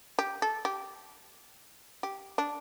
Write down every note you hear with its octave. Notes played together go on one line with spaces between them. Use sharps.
G4
A4
G4
G4
D4